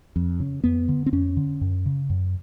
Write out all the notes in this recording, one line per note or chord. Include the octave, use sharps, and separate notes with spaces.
F2
C#3
F2 B3
D3
C4
F2 C#4
D3
F#2
C#3
F#2